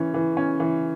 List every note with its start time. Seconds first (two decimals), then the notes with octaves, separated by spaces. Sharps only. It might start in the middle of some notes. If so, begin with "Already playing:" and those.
Already playing: E3 C#4
0.14 E3
0.37 C#4
0.60 E3